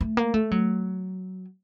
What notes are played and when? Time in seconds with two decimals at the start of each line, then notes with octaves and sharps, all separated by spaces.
0.01 A3
0.17 A#3
0.34 A3
0.51 F#3